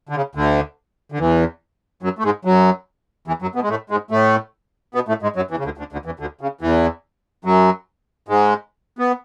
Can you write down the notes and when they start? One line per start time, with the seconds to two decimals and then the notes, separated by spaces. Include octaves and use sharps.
0.09 D3
0.15 C#3
0.35 D2 D3
1.12 D3
1.19 E2 E3
2.02 F#2 F#3
2.18 A3
2.24 G#2 G#3
2.45 F#2 F#3
3.27 E2 E3
3.42 F#2 F#3
3.55 B2 B3
3.62 G#3
3.69 A2 A3
3.90 G#2 G#3
4.11 A2 A3
4.95 B2 B3
5.08 A2 A3
5.22 G#2 G#3
5.36 F#2 F#3
5.51 E2 E3
5.58 C#3
5.64 D2 D3
5.78 D2 D3
5.92 D2 D3
6.05 E2 E3
6.19 D2 D3
6.41 C#3
6.61 E2 E3
7.44 F#2 F#3
8.28 G#2 G#3
8.99 B3